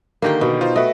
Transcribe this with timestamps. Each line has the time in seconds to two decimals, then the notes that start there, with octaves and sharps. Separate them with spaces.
0.22 D3 D#3 A#3 G4 G5
0.41 B2
0.61 D#4 F4 C5
0.76 A3 F#4 B4 D#5